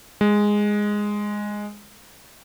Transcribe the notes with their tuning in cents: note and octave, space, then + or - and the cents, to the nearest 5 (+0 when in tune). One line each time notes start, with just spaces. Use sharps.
G#3 -5